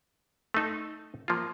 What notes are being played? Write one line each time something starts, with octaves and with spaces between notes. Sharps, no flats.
A3 D#4 A4
F3 A#3 F4